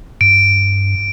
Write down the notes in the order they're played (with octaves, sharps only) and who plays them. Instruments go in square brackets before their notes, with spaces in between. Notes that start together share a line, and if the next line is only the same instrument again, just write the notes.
[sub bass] G2 [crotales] D7